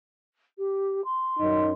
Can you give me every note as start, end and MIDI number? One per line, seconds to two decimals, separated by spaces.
0.58 1.01 67
1.04 1.71 84
1.40 1.71 42
1.40 1.71 63